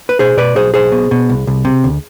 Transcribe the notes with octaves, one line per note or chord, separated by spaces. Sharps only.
B4
B2 G#4 C5
B2 B4 D5
B1 G#4 C5
B1 G#4 C5
B2
B2
C2
C2
C3
D2